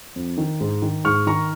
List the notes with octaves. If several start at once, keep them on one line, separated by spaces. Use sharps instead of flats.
F2
D#3
G#2
D#3
G#2 C#6 F6
D#3 A#5 C#6